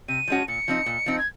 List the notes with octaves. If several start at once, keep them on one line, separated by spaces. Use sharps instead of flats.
C3 D#7
F3 G#3 C#4 F#4
A#2 C#7
F3 C4 D#4
A#2
F3 C4 D#4
G#6